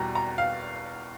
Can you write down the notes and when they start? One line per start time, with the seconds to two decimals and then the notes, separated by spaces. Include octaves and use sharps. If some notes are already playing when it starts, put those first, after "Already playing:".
Already playing: E2 B2 G3 A#5
0.15 A#5
0.38 F5